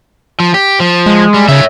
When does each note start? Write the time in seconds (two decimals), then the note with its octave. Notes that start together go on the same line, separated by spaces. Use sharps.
0.40 F3
0.54 G4
0.80 F3
1.06 G#3
1.34 G3
1.49 C#3 C#5 E5